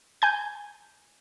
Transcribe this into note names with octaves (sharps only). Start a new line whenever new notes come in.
G#5 G6